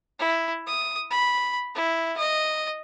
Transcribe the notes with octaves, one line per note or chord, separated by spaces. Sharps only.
E4
D#6
B5
E4
D#5